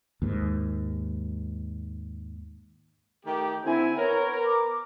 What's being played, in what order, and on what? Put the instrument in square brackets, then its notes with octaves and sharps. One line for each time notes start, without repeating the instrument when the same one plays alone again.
[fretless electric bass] D#2 G#2
[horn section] D#3 A3 G4
[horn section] D3 C4 G#5 [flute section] E4
[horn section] B3 A#4 [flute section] C#5 A#5
[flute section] D6